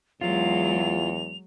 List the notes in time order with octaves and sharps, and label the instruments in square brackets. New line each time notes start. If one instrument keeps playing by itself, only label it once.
[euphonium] E2 [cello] F#3 G#3 [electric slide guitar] F4 [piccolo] F7